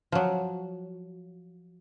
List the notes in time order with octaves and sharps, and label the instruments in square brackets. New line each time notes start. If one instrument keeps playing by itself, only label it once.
[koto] F3 F#3